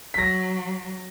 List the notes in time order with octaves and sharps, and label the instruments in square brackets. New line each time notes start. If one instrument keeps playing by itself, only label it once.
[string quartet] F#3 [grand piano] A#6 B6